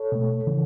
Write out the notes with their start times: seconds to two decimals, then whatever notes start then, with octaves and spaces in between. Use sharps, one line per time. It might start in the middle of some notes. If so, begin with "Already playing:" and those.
Already playing: A4 C#5
0.12 B2 A3
0.47 C#3 E3